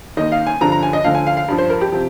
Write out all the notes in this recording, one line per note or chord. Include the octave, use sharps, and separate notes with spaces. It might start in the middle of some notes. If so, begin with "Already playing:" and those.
D#2 D#3 D#5
F5
G#5
G2 D3 F3 A#5
A#5
G#5
D#5
D2 D3 F3 F5
G#5
F5
F5
G2 F3
C5
A#4
G4
C3 F3